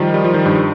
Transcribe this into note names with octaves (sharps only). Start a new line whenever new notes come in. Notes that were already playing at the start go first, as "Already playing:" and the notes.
Already playing: D#3 F3 G3
G3
F3
D#3
G2